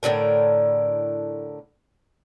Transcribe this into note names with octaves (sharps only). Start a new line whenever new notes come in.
A2 D3 D#3 A#4